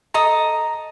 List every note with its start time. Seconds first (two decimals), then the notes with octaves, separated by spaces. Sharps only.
0.14 A4 D#5 A#5 D#6